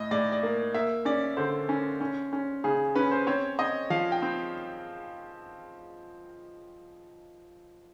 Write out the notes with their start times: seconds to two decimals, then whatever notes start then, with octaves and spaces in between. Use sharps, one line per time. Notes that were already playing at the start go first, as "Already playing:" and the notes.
Already playing: A2 D#5
0.11 A2 D5
0.32 D5
0.43 A#3
0.74 A#3 E5
1.05 C#4 D5
1.37 D3 C5
1.69 C#4
2.01 C#4
2.33 C#4
2.64 C#3 G#4
2.95 C#4 B4
3.11 C5
3.27 C4 C#5
3.59 C4 D#5
3.90 F3 F5
4.12 G5
4.22 C4